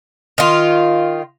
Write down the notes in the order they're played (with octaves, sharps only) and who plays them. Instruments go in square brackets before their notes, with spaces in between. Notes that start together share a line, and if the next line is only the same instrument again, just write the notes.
[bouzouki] D#3 F4